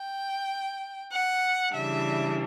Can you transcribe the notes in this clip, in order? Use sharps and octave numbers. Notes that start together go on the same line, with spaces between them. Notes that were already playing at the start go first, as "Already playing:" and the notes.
Already playing: G5
F#5
C#3 E3 G3 D4 E5